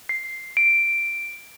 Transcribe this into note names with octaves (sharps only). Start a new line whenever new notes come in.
C7
D7